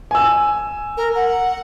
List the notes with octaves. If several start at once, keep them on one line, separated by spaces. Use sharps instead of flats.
G#5 E6
A#4
F#5